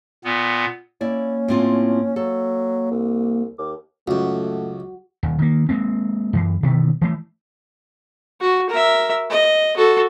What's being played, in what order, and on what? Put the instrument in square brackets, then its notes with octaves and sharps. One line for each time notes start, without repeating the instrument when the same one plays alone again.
[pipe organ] A#2 B3
[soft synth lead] A#3 [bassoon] C#4 [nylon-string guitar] E4 D5
[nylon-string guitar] A2 C4 F4
[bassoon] F#3 [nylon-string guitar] A4
[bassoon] C2
[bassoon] D#2 [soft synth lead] D6
[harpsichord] C#2 F#2 [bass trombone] A3 [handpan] F#4
[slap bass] D#1
D#3 A#3
G#3 A#3 C4
F#2 E3
B2 D#3 E3 B3
E3 A3
[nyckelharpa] F#4
A#4 E5
D#5
F#4 A4